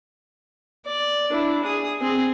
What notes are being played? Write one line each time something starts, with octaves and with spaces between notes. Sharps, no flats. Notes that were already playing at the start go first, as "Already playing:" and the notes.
D5
D4 E4
G#4 D#6
C4 G#4